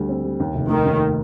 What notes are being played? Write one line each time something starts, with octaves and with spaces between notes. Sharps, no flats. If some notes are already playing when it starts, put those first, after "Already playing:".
Already playing: D2 G3
C4
G3
D#2
F1
D#3 A3
D#2